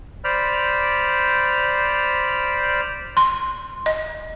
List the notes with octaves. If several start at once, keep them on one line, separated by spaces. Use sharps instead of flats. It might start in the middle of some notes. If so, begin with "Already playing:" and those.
C5 D5 B5 F6
C6
D#5